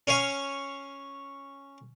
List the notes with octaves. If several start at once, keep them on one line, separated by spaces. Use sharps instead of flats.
C#4 C#5 F5 G#5